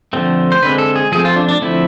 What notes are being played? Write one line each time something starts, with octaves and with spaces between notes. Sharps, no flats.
D3 F3 A3 C4
C5
D3 G#3 C4 B4
A4
G#4
F3 A3 C4 G#4
F4
D4
D4
D3 F3 A3 C4 E4